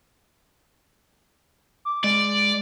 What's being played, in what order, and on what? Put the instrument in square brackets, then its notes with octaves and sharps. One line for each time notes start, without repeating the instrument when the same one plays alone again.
[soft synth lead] D6
[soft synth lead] G#3 [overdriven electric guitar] D5